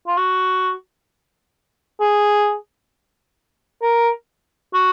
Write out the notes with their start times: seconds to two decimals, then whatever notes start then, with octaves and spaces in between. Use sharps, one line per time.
0.08 F4
0.18 F#4
2.01 G#4
3.82 A#4
4.74 F#4